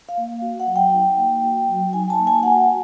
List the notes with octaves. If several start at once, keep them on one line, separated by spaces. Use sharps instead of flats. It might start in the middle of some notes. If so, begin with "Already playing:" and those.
F5
A#3
F#4
F#5
F#3
G5
D#4
A#3
F#4
F#3
D#4 G#5
A5
A#3
G#5
F#4 F#5